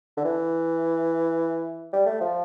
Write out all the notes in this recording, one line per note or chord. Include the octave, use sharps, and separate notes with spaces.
D3
E3
G3
A3
F3